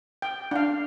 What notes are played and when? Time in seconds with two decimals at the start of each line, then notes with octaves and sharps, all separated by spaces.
0.22 G5
0.51 D4 F5